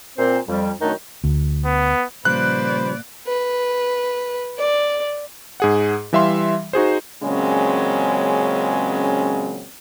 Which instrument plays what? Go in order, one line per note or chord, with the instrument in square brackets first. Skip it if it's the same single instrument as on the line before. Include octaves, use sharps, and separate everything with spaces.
[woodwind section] A#2 C4 C5
F2 G3
F#2 D#3 F#3 A3 D4 D#4
[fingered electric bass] D2
[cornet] B3
[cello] A#2 D5 [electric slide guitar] C#3 F3 G3 [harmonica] B4 C5 [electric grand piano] F#6
[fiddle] B4
D5
[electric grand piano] G#2 G#4 F#5
E3 G3 E5 F5 C6
D#4 F#4 G#4 C5
[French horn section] A#2 C#3 F#3 G#3 C4 C#4